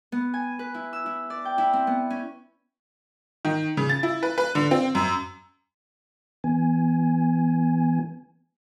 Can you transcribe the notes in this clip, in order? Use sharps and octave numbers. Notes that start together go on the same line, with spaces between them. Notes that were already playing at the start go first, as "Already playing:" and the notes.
B3
G#5
B4
E4
E6
E4
D5
G5
E4
C4
B3
C#4
D#3
C#3
A6
E4
B4
B4
D3
C4
F#2
E3 B3 G#5